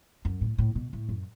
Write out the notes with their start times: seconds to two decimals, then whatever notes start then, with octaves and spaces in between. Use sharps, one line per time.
0.25 F#2
0.41 A2
0.58 A2
0.75 B2
0.93 A2
1.09 F#2